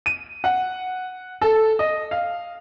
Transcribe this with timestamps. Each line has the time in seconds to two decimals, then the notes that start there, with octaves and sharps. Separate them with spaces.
0.06 D#7
0.44 F#5
1.41 A4
1.79 D#5
2.11 F5